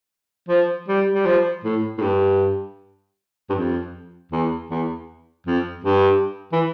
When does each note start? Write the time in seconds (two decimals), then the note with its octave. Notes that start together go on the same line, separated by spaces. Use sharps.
0.49 F3
0.88 G3
1.14 G3
1.26 F3
1.64 A2
1.98 A2
2.02 G2
3.50 G2
3.55 F2
4.32 E2
4.70 E2
5.47 F2
5.84 G2
6.52 E3